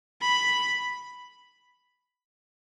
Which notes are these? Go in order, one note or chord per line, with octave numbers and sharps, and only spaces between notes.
B5